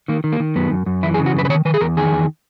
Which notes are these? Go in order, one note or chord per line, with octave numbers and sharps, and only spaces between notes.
D#3 A#3
D#3
A#3
D#3
F#2 B3
F#2
F#2
E3 E4
G#4
C#3
F#4
F#2 B4
B4
D#3 C#5
D#3 B4
G#4
E2 A#4
D#3 G#4
E2